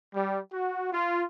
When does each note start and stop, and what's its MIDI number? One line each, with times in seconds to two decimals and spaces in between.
0.13 0.40 55
0.52 0.89 66
0.93 1.25 65